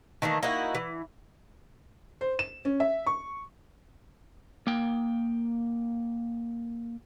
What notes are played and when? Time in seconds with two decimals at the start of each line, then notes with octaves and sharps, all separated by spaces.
0.22 D#3 E3 A3 A#3
0.43 A#3 D#4 E4 F#4
0.75 E3
2.21 C5
2.39 E7
2.65 C#4
2.80 E5
3.06 C#6
4.67 A#3 G5